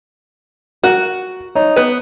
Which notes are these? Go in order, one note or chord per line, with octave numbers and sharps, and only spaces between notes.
F#4 A#4 F#5
D#4 C#5
B3 B4